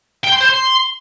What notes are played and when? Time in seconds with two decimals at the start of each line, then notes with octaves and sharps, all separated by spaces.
0.24 G5
0.33 C6
0.41 C5
0.50 C6